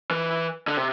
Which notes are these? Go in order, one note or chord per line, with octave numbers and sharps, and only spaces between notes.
E3
D3
C3